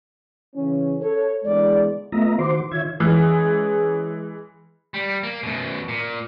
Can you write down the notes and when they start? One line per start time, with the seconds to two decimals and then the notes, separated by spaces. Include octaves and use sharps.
0.55 C#3 E3 C#4
1.01 A4 C#5
1.44 E2 D3 G#3 D5
2.12 A3 B3 F4 D#5 E5 A#5
2.39 D#3 F#4 C5 C6 D6
2.71 D#3 F4 C#5 E5 G#6
3.00 E3 G#3 C#4 G#4
4.94 G3
5.23 A#3
5.43 F#2 B2
5.89 A#2